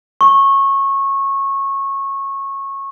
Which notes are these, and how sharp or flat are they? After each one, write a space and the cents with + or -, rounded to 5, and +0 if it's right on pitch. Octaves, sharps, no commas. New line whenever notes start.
C#6 -20